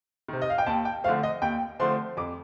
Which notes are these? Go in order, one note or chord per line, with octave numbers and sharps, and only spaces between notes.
C3 D#3
D#5
F5
G5
D#2 A5
G5
D3 F3 A3 C4 F5
D#5
D#2 G5
D3 F3 A3 C4 C6
F2 D6